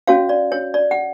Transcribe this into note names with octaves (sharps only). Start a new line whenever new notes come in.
C#4 F#4 C#5 F5
D5
C#5
D5
F#5